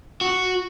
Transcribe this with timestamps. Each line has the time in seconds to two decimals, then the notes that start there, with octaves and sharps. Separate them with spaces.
0.21 F#4